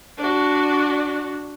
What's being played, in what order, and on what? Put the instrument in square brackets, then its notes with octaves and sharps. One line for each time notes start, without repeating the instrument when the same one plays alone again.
[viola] D4 F#4